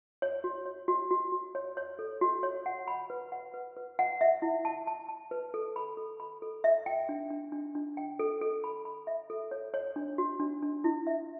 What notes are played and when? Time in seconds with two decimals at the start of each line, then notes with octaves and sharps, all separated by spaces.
0.22 C#5
0.44 F#4
0.66 C#5
0.88 F#4
1.11 F#4
1.32 F#4
1.55 C#5
1.77 C#5
1.99 A4
2.21 F#4
2.43 C#5
2.66 F#5
2.88 B5
3.10 B4
3.32 F#5
3.54 B4
3.77 B4
3.99 F#5
4.21 E5
4.42 E4
4.65 A5
4.87 A5
5.09 A5
5.31 B4
5.54 A4
5.76 B5
5.97 A4
6.20 B5
6.42 A4
6.64 E5
6.86 G5
7.09 D4
7.30 D4
7.52 D4
7.75 D4
7.97 G5
8.19 A4
8.41 A4
8.64 B5
8.85 B5
9.07 E5
9.30 A4
9.51 C#5
9.74 C#5
9.96 D4
10.18 F#4
10.40 D4
10.62 D4
10.84 E4
11.07 E5